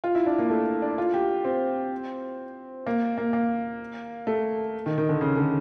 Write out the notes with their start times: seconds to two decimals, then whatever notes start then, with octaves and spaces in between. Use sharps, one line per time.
0.04 F4
0.15 E4
0.26 D4
0.38 A#3
0.50 A3
0.82 D4
0.98 F4
1.14 G4
1.45 C4
2.87 A#3
3.18 A#3
3.33 A#3
4.27 A3
4.86 D#3
4.98 D#3
5.09 D3
5.21 C#3
5.37 D3